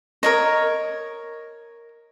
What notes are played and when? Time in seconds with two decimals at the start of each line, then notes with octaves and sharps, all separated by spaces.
0.23 A#4 C#5 D#5